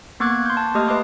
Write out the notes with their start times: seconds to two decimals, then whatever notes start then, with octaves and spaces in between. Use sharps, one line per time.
0.20 A#3 B3 C#6 D6 F#6 G#6
0.46 C6 G6
0.57 A5
0.74 A3 A#3 G4 D#5 D#6 F6
0.88 B4 D#5 C6 D6